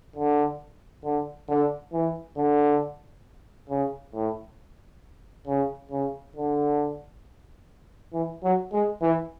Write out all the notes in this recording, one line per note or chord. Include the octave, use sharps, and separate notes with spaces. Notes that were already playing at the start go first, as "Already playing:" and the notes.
D3
D3
D3
E3
D3
C#3
A2
C#3
C#3
D3
E3
F#3
G#3
E3